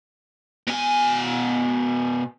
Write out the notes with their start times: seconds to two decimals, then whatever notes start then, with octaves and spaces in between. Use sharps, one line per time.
0.68 B2 G#5